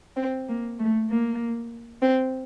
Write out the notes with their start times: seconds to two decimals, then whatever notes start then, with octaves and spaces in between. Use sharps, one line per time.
0.16 C4
0.48 A#3
0.78 A3
1.09 A#3
2.02 C4